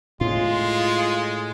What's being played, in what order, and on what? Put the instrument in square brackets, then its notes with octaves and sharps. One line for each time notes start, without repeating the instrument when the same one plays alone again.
[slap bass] A2 [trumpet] G#3 [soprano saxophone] F4